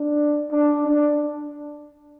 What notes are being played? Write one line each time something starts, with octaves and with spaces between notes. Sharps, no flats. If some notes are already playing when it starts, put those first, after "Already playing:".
Already playing: D4
D4
D4